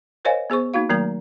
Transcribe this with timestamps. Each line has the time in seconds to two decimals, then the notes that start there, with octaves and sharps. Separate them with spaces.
0.25 A#4 C5 C#5 D#5 F5 G#5
0.50 B3 G#4 C5 C#6
0.74 A#3 D#4 F#4 F5
0.89 D#3 F#3 A3 A#3 A#5